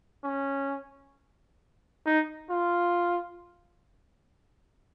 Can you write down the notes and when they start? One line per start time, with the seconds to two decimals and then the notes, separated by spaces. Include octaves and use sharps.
0.24 C#4
2.06 D#4
2.50 F4